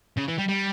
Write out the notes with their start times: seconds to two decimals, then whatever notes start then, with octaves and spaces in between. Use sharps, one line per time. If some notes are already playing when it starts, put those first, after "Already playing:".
0.17 C#3
0.28 E3
0.38 G3
0.48 G3